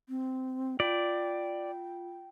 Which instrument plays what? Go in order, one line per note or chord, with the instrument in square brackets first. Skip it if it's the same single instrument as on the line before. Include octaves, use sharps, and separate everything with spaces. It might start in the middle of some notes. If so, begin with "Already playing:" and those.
[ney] C4
[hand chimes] F4 [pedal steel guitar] D5 [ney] G5